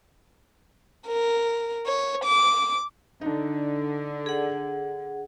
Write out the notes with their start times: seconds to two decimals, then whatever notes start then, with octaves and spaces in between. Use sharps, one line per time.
1.08 A#4
1.87 C#5
2.24 D6
3.21 D3 D4 D#4
4.26 G#4 F#5